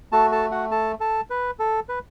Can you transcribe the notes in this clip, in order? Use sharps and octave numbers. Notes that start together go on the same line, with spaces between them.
A3 F#4 A4 A5
A4 A5
F#4 F#5
A4 A5
A4 A5
B4
A4
B4